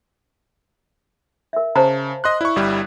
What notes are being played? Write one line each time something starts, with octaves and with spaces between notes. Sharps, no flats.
A#4 E5
C#3 C5 A5 A#5
D#5 C6 F#6
E4 D5 C#6
G1 G3 E4